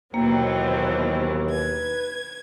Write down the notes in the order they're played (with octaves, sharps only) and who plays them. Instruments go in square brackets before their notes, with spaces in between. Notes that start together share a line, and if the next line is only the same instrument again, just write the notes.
[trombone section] D#2 [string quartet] B2 E3 F#3 [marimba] A#3 [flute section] C5 G5
[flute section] B4 [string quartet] G#6